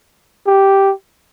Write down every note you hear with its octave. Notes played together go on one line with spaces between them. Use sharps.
G4